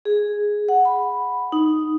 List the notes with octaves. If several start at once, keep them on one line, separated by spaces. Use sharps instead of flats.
G#4
F#5
B5
D#4